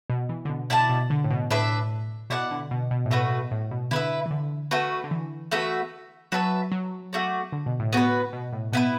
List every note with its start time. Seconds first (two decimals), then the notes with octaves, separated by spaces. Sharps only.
0.10 B2
0.29 E3
0.45 D3
0.49 B2
0.70 B2 E4 D5 A5
0.89 B2
1.10 D3
1.24 A2
1.31 B2
1.51 A2 D4 B4 E5
2.30 B2 E4 D5 F#5
2.51 D3
2.71 B2
2.91 B2
3.06 A2
3.11 B2 A3 F#4 B4
3.31 B2
3.51 A2
3.71 B2
3.91 D3 E4 B4 E5
4.26 E3
4.31 D3
4.71 A3 F#4 B4
5.04 D3
5.11 E3
5.51 A3 F#4 B4 E5
6.32 F#3 F#4 B4 E5 A5
6.72 F#3
7.13 A3 F#4 D5
7.52 D3
7.66 B2
7.80 A2
7.93 B3 F#4 B4
8.33 B2
8.53 A2
8.72 B2 B3 E4 B4